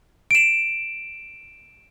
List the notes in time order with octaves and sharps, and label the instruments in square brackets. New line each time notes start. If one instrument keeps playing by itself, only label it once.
[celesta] D7 E7